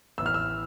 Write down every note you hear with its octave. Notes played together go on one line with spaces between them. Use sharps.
A1 A2 E3 B3 E6
F6
E6